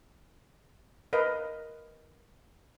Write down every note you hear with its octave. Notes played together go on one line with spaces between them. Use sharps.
A#4 B4 D#5 F5